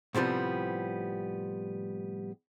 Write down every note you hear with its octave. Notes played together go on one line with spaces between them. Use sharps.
A2 C3 F3 G3 B3